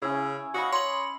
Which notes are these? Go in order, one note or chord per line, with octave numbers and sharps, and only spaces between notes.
C#3 C#4 E4
F#4 D#5 F5 B5
C#5 C6 F#7